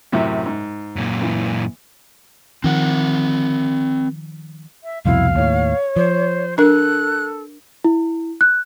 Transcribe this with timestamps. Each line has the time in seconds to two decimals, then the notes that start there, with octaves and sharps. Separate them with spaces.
0.12 F#2 A2 C3
0.46 G#2
0.96 F#2 A#2
1.22 E3
2.64 D#3 F3 C4 A#4 F#5
4.84 E5
5.06 C2 F2 B2 E4 F5
5.35 D#2 A2 C#5
5.96 F3 C5
6.58 D4 A4 A#4 F#6
7.84 E4
8.41 F#6